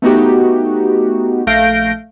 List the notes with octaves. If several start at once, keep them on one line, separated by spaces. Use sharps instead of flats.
A3 B3 D#4 F#4 G4
A#1 A3 F5 G6 A#6 D7